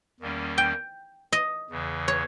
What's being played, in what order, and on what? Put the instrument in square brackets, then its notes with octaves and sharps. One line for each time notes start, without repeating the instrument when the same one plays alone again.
[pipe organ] E2 D#3 G3 A#3 C#4
[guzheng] G5
D#5
[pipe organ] E2 C#3 E3
[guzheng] C#5